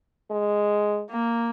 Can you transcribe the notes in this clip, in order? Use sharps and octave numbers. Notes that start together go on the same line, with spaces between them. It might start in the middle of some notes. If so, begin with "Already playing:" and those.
G#3
A#3